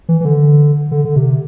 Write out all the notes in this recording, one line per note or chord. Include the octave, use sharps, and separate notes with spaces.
E3
E3
D3
D3
D3
C3